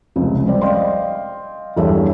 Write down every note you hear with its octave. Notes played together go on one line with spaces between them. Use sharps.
F1 C#2 C3
G3 G4 C5 D5
D5 D#5 F5 G5 C6
E2 G2 G4 A4 C#5 E5